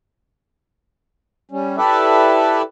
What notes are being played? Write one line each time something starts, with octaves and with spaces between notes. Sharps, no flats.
G3 C#4
E4 G4 A4 B4 D5 E5